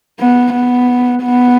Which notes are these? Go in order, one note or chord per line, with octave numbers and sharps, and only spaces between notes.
B3
B3
B3